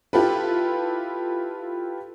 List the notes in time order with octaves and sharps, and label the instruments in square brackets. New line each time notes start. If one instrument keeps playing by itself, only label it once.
[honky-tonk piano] E4 F4 G4 A4 B4